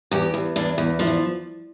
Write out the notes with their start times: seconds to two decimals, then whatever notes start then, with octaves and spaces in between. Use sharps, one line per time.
0.11 E2 G4
0.34 E2
0.56 E2 D4
0.78 E2
0.99 F3 D4
1.07 E4